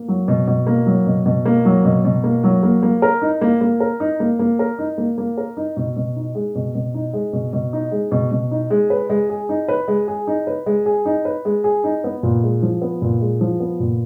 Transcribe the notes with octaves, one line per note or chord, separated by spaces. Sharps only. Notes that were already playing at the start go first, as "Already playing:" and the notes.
Already playing: A#3
F#3
B2
B2
A#3
F#3
B2
B2
A#3
F#3
B2
B2
A#3
F#3
A#3
A#3
A#4
D#4
A#3
A#3
A#4
D#4
A#3
A#3
A#4
D#4
A#3
A#3
A#4
D#4
B2
B2
D#4
G#3
B2
B2
D#4
G#3
B2
B2
D#4
G#3
B2
B2
D#4
G#3
B4
G#3
G#4
D#4
B4
G#3
G#4
D#4
B4
G#3
G#4
D#4
B4
G#3
G#4
D#4
B3
A#2
G#3
F3
B3
A#2
G#3
F3
B3
A#2